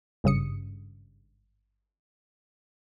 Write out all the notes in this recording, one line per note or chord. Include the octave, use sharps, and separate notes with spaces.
G#1 G2 C#3 D#6 C#7